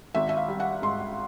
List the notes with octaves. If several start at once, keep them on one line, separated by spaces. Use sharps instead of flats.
G#1 E5
E5
F5
G3
F#5
G#2 C6